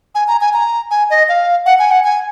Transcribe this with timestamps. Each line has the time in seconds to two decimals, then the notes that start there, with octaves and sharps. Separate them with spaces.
0.15 G#5
0.28 A#5
0.41 G#5
0.54 A#5
0.91 G#5
1.10 D#5
1.29 F5
1.66 F#5
1.79 G#5
1.91 F#5
2.04 G#5